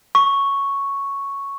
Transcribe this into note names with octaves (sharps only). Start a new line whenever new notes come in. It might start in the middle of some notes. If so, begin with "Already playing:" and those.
C#6